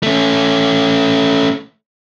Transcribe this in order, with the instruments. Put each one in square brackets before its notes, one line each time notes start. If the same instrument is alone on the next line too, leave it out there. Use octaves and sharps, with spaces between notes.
[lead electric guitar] A3 C#4